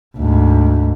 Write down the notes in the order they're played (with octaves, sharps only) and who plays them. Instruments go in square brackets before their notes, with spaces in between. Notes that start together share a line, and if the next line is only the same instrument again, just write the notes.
[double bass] D2 G#2